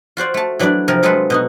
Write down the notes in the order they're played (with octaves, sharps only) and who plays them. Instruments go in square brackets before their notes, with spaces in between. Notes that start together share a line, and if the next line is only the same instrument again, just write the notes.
[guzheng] F4 F#4 C5 D5
A3 A5
E3 F#3 D4 E4 D5
C3 F3 A#4
C3 F#3 G#3 F4 A4 B4
B2 D#4 F#4